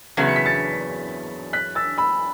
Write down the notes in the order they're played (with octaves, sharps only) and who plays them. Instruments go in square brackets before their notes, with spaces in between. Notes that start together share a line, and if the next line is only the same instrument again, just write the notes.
[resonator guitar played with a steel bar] E2 C#3 F#3 B3
[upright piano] C#7
B6
A6 C#7
F#6 B6
E6 A6
B5 E6